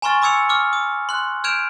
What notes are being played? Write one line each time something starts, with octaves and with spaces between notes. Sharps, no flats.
G#5 A#5 C6 C#6 F6 A6
B5 D6 E6 G#6 C#7 F7
C#6 D6 F6
D#6
C6 F#6
F6 G6 G#6 D7 E7 F7